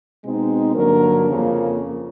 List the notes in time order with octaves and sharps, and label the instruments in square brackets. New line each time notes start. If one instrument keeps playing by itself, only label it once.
[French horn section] B2 G#3 C4 D#4
G2 D3 F#3 A#3 D4 A#4
F2 C#3 F3 A#3